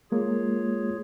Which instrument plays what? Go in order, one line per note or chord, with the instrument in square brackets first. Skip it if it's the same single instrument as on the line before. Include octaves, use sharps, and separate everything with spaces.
[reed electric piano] G#3 A#3 [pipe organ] F4 G#4 C#5